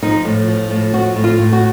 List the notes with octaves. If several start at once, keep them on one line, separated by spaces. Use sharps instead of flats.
F3 D#4
A2
F3
A2
F3 F#4
A2
F4
A2
F#4